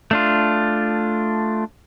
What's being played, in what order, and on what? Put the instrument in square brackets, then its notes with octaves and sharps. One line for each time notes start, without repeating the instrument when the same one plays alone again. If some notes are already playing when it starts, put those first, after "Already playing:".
[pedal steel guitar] A3 D4 F4